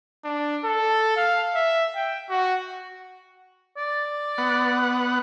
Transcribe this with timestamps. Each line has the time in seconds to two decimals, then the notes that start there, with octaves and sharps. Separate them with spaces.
0.24 D4
0.64 A4
1.17 F5
1.55 E5
1.95 G5
2.29 F#4
3.77 D5
4.38 B3 F#5